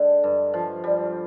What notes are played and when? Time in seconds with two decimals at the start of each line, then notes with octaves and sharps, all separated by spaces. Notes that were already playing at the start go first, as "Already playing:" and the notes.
Already playing: D3 G#3
0.24 G2
0.54 F3
0.84 G3